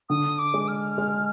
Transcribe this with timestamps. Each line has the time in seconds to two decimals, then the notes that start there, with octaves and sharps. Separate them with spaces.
0.09 D3 D#6
0.39 D6
0.54 G#3
0.68 F6
0.98 G#3